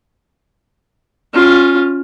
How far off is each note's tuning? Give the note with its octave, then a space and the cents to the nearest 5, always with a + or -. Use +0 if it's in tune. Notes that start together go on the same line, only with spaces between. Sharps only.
C#4 +0 F4 +15